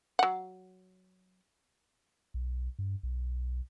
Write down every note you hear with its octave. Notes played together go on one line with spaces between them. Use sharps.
F#3 F#5
B1
G2
B1